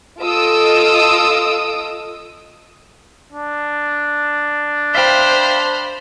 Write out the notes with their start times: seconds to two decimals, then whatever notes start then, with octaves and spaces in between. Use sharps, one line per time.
0.20 F4 A4 D#5 D#6 E6 D7
3.33 D4
4.95 C5 E5 F5 G5 B5 F6 G6